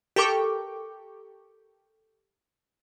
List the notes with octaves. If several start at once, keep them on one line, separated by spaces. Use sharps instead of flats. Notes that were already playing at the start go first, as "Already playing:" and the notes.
G4 A4 A#4 G5 C#6 D6